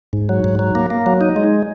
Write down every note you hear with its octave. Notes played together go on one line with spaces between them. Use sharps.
G#2
F#3
G#2
F#3
A#3
A#3
F#3
D#4
G#3